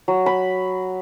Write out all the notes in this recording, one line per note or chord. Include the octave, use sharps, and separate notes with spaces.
F#3
B5